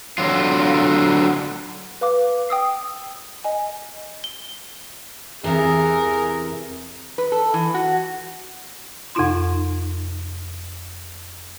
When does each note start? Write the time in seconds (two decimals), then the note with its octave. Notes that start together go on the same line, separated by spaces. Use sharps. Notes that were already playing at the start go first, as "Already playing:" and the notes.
0.18 D3 F#3 F4
2.01 B4 F5 D6
2.49 G5 D#6 E6 C7
3.44 D#5 G#5
4.24 G7
5.44 E2 C3 E3 G#4 A#4
7.18 B4
7.32 A4
7.54 E3
7.74 F#4
9.15 F2 C3 D#4 F4 C6